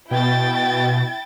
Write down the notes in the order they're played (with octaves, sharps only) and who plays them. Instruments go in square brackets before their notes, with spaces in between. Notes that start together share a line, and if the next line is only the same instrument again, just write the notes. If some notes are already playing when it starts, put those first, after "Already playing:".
[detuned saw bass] B2 [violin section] E4 G5 A6